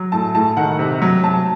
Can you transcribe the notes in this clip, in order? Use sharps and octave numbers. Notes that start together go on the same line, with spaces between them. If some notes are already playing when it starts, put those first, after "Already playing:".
Already playing: F#3
A2 A5
A2 A5
D#3 F#5
C3
F#3
F#3 A5